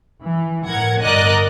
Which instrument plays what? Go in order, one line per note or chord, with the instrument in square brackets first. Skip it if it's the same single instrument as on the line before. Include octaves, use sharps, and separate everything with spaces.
[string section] E3
A2 A#4 F#5 G#6
G1 A#4 D5 D#5 A#5 F#6